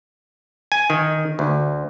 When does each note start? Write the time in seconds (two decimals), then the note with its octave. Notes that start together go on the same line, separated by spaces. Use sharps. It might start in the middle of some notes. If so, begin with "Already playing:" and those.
0.72 G#5
0.90 D#3
1.39 D2